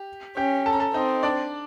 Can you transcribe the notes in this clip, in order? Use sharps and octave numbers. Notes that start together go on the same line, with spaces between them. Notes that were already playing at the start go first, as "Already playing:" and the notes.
Already playing: G4
C#4 G4 G5
A4 A5
A#5
A4 A5
C4 D#4 D#5
D4 D5